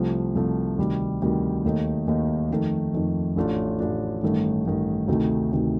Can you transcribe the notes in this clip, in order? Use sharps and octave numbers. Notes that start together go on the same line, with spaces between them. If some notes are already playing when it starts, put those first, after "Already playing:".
Already playing: C2 C3 F3 A3
C2 C3 F3 A3
D2 C3 D#3 G3
D2 C3 D#3 G3
D#2 D#3 A3 D#4
D#2 D#3 A3 D#4
F2 D#3 A3
F2 D#3 A3
A1 A2 A3 D4 F4
A1 A2 A3 D4 F4
A1 G2 D#3 A3
A1 G2 D#3 A3
D2 C3 D#3 A3 D#4
D2 C3 D#3 A3 D#4